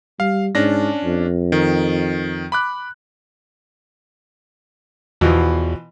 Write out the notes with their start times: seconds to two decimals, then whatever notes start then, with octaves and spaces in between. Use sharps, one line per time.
0.20 G3 F5
0.55 G#2 C#4 D4 A#6
1.05 F2
1.52 D#3
2.52 B5 D6 F#6
5.21 E2 B2 E3 F3